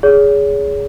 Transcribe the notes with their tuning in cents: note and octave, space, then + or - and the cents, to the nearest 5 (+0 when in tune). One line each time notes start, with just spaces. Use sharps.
G#4 +0 C#5 +35